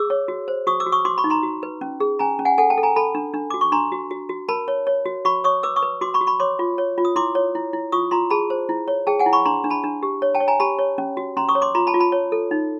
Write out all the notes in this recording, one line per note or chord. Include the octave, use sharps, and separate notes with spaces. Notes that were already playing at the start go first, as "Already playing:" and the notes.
Already playing: G#4 D6 E6
C#5
F#4
C5
F#4 C#6 D#6
D6 E6
F#4
C#6 D#6
F#4 C6 D6
B5 C#6
D#4
A#5 C6
F#4
B4
C#4
G#4
C#4 G#5 A#5
C#4
F#5 G#5
A4 F#5 G#5
G5 A5
A4
G#5 A#5
A4 A5 B5
D4
D4
F#4 D6
C#6
D4 A#5 C6
F#4
F#4
F#4
A#4 A5 B5
C#5
C#5
F#4
F#4 B5 C#6
C#5 C#6 D#6
B4 D6 E6
C#6 D#6
B4
F#4 C6 D6
B5 C#6
F#4
B5 C#6
C#5 C6 D6
F4
C#5
F4
D#6
E4 C6 D6
C#5
E4
E4
F4 C#6 D#6
F4 A#5 C6
G#4 A5 B5
C5
E4
C#5
G#4 G5 A5
F#5 G#5
E4
B5 C#6
D4 A#5 C6
D4
A5 B5
D4
G4
C#5
G5 A5
C#5
G#5 A#5
G4 A5 B5
C#5
C#4
F#4
C#4 A#5 C6
C#6 D#6
C#5
C6 D6
F4 A#5 C6
A5 B5
F4
A5 B5
C#5
A4
D#4